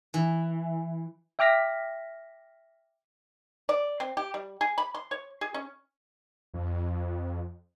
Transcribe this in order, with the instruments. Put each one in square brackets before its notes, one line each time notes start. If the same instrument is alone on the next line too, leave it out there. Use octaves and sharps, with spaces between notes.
[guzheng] E3
[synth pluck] E5 G5 D6 F6 A#6 B6
[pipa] D5
C4
G4
G3
G#4
B5
C6
C#5
G#4
C#4
[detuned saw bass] F2